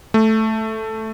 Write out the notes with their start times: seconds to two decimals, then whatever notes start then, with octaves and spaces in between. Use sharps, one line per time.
0.14 A3